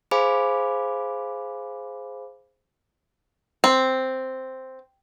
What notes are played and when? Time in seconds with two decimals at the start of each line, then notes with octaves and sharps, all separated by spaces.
0.11 G#4 C5 F5 G#5 B5 D6
3.64 C4